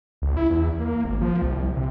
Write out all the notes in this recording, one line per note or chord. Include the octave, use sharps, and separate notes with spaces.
C#2
E4
E2
A#3
G#1
F3
C2
C2
C3